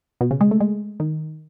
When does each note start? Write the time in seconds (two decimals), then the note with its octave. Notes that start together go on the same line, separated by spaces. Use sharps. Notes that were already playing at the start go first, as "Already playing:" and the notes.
0.21 B2
0.31 C#3
0.41 G#3
0.51 A3
0.61 G#3
1.00 D#3